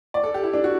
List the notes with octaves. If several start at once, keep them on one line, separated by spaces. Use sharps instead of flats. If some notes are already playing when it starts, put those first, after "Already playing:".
D5
A4
G4
E4
D4
F#4